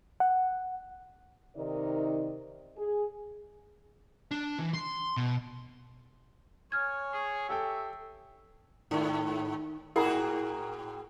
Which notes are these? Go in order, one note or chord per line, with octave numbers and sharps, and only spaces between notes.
F#5
C3 D#3 D#4 A#4 D5 D#5
G#4
D4
E3
C6
B2
C#5 G#5 F6 G#6
G#4 C#6
G4 A4 E5 G5
G#2 D#3
A2 E4 F#4 G#4 A#4 F#5 A#5